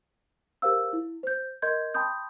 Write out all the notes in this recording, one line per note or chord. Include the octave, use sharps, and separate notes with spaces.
G4 A#4 C5 F5 E6
E4
C5 G6
A#4 D#5 C6 G6 G#6
G5 A5 B5 C6 D#6 G6